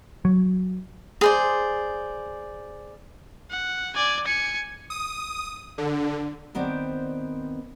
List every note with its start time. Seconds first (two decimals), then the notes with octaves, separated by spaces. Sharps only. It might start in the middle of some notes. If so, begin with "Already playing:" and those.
0.25 F#3
1.21 G#4 C5 D5
3.51 F#5
3.95 D5 G#5
4.25 G#5 C#7
4.90 D#6
5.78 D3
6.55 D#3 B3 C4 C5 D5